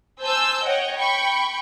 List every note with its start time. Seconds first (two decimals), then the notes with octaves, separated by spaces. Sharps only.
0.23 C5 G#5 A5 E6 G6
0.65 C#5 D#5 F#5 G5
0.96 G5 B5 C#6